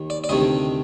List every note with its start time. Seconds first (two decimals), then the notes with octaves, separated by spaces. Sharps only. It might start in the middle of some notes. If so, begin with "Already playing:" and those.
Already playing: D#2 D#3
0.10 D5
0.24 D5
0.29 D2 C3 D#3 D#5